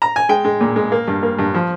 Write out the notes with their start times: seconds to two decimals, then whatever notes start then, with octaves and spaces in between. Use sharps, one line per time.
0.02 A#5
0.16 G#5
0.29 G#3 G5
0.45 G#3
0.61 A#2
0.76 G#3
0.92 A#3
1.08 G2
1.23 A#3
1.39 G2
1.54 F3